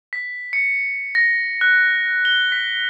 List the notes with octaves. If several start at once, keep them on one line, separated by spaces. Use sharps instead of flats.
B6
C#7
A#6
F#6
G7
B6